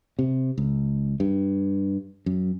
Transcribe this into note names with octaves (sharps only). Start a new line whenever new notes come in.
C3
C#2
G2
F#2